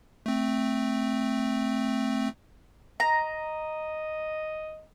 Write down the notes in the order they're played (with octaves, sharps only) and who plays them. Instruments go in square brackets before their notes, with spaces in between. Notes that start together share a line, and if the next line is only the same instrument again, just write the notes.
[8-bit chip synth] A3 C4
[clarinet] D#5 [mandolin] A#5